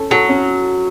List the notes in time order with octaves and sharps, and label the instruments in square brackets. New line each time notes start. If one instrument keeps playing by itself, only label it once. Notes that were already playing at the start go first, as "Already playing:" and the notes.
Already playing: [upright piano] C#4 A4
[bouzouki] F#3 [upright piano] A4
[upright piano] C#4